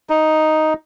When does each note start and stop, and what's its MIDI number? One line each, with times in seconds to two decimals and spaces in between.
0.10 0.74 63